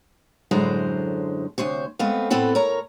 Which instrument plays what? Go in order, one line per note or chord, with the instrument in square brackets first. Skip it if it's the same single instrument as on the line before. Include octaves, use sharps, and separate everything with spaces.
[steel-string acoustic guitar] F#2 A2 D3 G#3 C5 A#5
D2 C3 C5 C#5
G#3 A3 B3 C4 F5
A2 B3 C4 A4 F#5
A#4 C#5 A#5